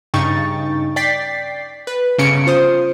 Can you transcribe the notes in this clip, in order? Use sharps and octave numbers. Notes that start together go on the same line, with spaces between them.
G2 C#3 D#4 G5 C#6 A6
D5 G5 A6 B6 C7
B4
G1 C#3 C#4 C#7 D7
F4 C5 D#6